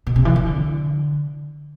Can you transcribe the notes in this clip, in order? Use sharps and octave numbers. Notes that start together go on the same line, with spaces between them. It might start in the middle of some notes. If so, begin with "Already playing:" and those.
B2
C3
E3
E3
D3